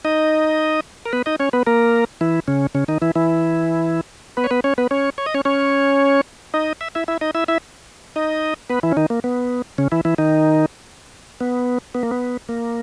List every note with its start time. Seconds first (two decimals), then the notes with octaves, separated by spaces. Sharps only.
0.05 D#4 D#5
1.06 A#4
1.13 B3 B4
1.26 D#4 D#5
1.40 C#4 C#5
1.53 B3 B4
1.66 A#3 A#4
2.21 E3 E4
2.48 C#3 C#4
2.75 C#3 C#4
2.88 D#3 D#4
3.02 E3 E4
3.15 E3 E4
4.37 B3 B4
4.44 C#5
4.51 B3 B4
4.64 C#4 C#5
4.78 B3 B4
4.91 C#4 C#5
5.18 C#5
5.26 D#5
5.34 C#4 C#5
5.45 C#4 C#5
6.54 D#4 D#5
6.81 E5
6.95 E4 E5
7.08 E4 E5
7.21 D#4 D#5
7.35 E4 E5
7.48 E4 E5
8.16 D#4 D#5
8.70 B3 B4
8.83 E3 E4
8.92 C#4
8.97 D#3 D#4
9.10 A#3
9.24 B3
9.78 C#3 C#4
9.92 E3 E4
10.05 E3 E4
10.18 D#3 D#4
11.41 B3
11.95 B3
12.03 A#3
12.11 B3
12.49 A#3